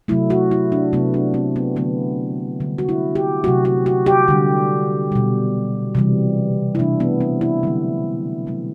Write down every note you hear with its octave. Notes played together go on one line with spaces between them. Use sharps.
C3 F#3 A3 E4
F#4
E4
D4
C3 F#3 A3 B3
D4
C4
B3
D3 F#3 A3 B3
D3 G3
F#4
E4
G4
C3 F#3 A3 F#4
F#4
F#4
G4
D3 G3
B2 G3
C3 E3 G3
E4
C3 E3 A3 D4
B3
C4
E4
D3 F#3 A3
B2 F#3 A3